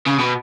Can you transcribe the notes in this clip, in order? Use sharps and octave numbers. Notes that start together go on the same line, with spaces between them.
C#3
B2